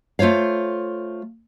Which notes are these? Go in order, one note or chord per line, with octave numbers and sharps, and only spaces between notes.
A3 F4 C5 C#5 F5